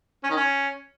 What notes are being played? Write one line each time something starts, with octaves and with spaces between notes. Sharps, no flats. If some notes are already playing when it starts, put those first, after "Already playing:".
C#4
D#3
C#4